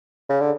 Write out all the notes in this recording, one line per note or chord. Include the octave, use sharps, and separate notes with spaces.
C#3
D3